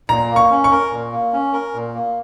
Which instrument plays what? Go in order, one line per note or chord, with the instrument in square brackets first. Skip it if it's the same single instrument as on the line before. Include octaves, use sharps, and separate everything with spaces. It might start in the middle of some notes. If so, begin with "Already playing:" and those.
[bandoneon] A#2 [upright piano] A#5
[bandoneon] A#3
[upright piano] C#6
[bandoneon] C#4
[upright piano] C#6
[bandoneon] A#4
A#2
A#3
C#4
A#4
A#2
A#3